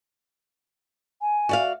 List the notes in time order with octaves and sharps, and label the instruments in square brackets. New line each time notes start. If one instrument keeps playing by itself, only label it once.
[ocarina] G#5
[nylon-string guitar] F#4 D5 F5